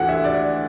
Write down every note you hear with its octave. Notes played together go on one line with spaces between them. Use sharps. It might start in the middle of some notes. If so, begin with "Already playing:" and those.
Already playing: D2 E3 F#5
E5
D5